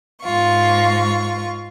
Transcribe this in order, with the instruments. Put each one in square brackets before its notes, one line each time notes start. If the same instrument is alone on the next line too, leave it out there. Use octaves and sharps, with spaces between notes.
[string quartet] G#2 F4 C#6